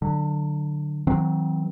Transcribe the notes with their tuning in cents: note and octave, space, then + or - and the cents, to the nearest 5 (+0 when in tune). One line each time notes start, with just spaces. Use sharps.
D3 +20 F#3 +0
D#3 +45 F#3 +0 C4 +0